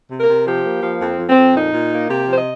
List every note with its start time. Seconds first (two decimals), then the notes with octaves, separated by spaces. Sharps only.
0.11 C3
0.20 A#4
0.29 C3
0.47 F3 G4
0.65 A#3
0.83 F3
1.01 F2 C4
1.19 F2
1.28 C4
1.37 F2
1.55 A#2 D#4
1.73 A#2
1.92 A#3
2.10 C3 G4
2.28 F3 C5
2.37 D#5